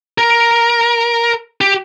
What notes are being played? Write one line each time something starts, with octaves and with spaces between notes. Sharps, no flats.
A#4
G4